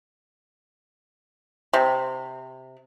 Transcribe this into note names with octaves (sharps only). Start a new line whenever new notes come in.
C3